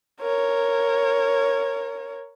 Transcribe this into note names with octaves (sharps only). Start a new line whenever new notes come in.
A#4 C#5